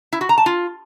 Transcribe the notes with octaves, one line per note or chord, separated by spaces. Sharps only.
E4
F#4
A#5
A5
F4